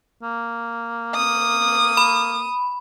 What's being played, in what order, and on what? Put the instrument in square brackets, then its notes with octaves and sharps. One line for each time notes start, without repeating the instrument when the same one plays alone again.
[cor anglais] A#3
[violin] D#6
[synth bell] B5